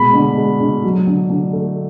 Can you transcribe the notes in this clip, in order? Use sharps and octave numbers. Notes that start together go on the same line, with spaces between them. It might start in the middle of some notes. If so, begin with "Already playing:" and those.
Already playing: B2 G#3 B5
D3
G#3
D3
F#3
D3
D3
A3